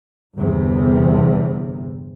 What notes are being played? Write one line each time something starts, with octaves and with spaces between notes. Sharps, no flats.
G1 E2 C3